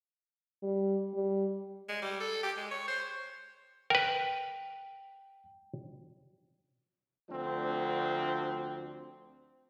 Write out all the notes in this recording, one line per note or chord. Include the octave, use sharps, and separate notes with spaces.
G3
G3
G#3
G3
A4
G4
G#3
C#5
C5
A#4 B4 G5
D2 F3 C4 D4